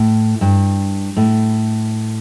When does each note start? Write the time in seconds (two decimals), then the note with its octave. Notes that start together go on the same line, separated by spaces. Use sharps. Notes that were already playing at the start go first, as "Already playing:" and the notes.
Already playing: A2
0.41 G2
1.17 A2